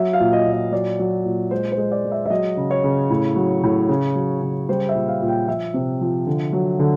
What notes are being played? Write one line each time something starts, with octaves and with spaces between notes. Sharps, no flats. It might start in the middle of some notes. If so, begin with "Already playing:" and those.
Already playing: F#3 E5
F5
A#2
D#5
A#2
D#5
F#3 D5
F#3
A#2
G#3 C5
C5
G#3
D5
G#3
E5
E5
F#3 D#5
C#3
C#5
C#3
A2
F#3
A2
C#3
F#3
C#3
G3 C5
E5
A#2
F5
A#2
G5
F3 E5
C3
F3
D3
F#3
D3